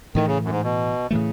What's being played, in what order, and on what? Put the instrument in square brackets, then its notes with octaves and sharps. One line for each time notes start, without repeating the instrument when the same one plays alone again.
[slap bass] A2 E3 A3 [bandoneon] D#3
[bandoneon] C#3
F#2
G#2
B2
[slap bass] A2 E3 A3 [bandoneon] C#3